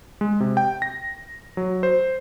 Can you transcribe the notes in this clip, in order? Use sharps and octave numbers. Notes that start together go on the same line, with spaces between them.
G#3
C3
G5
A#6
F#3
C5